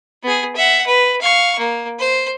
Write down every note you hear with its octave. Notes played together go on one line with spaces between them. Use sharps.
B3 G#4
E5 F#5
B4
F5 C#6
A#3
C5